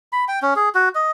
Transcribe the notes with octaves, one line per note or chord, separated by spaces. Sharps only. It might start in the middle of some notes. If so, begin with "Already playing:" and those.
B5
G5
C#4
G#4
F#4
D#5